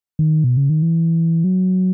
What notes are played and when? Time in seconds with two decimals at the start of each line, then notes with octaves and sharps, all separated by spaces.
0.19 D#3
0.44 B2
0.57 C#3
0.70 D#3
0.82 E3
1.44 F#3